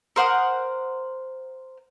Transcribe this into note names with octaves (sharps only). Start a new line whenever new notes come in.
A#4 C5 F#5 D#6